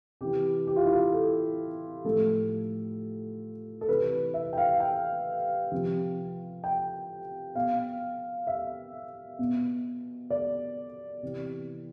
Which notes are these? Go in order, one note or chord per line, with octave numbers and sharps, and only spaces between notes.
C3 E3 G4
G4
F4
E4
F4
A4
A2 F3 A4
A4
C3 E3 B4
E5
G5
F5
G5
C3 F3
G5
B2 F5
E5
B2
D5
C3 E3